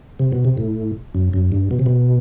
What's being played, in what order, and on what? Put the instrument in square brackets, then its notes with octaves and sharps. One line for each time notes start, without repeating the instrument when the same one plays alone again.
[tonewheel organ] C3
B2
C3
A2
F#2
F#2
G2
B2
C3
B2